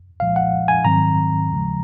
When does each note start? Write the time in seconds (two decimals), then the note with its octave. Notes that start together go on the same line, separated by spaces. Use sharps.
0.20 C2 A#2 F3 G#3 F5
0.36 F#5
0.68 G#5
0.85 G#2 D#3 F#3 C4 A#5
1.50 D#2 C#3 F3 G#3